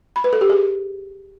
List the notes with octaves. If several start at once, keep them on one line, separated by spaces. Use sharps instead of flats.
B5
B4
A4
G4
G#4